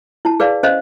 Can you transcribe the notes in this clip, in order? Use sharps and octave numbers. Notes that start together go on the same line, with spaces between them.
E4 A5
G#4 B4 D5 F5
C#4 C5 D#5 F5